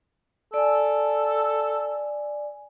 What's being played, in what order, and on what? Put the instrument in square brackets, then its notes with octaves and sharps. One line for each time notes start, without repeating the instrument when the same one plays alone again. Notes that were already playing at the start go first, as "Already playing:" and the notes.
[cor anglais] A4 [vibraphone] D5 G#5